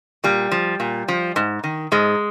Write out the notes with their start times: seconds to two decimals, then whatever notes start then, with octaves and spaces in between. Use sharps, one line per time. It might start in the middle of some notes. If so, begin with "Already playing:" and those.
0.24 A#2 G3
0.52 F3
0.80 A#2
1.08 F3
1.36 G#2
1.64 D#3
1.92 G#2 G#3